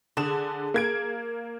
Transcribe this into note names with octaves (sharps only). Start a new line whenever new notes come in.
D3 G#4 E7
A#3 G#6 D7